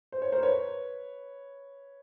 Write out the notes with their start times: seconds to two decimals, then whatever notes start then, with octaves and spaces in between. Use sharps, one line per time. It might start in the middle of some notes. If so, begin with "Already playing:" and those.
0.12 C5
0.22 C#5
0.32 A#4 C5
0.43 B4 C#5